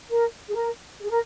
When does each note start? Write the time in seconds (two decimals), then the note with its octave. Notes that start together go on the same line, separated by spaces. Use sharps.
0.10 A#4
0.50 G#4
0.55 A#4
1.01 G#4
1.10 A#4